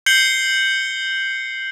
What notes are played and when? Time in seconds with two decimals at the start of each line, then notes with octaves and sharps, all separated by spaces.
0.06 G6 C7 C#7 F#7 G7